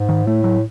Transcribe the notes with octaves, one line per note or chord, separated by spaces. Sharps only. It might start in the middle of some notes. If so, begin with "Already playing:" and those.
Already playing: G#2
D#3
A2 A3
F#3